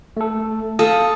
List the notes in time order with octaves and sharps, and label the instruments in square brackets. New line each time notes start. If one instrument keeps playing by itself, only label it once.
[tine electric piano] A3 A4
[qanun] A4 [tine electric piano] F5 A5 D#6